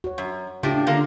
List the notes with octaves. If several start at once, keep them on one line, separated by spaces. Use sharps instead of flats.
F#4 C#5
F#2
A2 C#3 D4 F4 G4
D3 A#3 A#4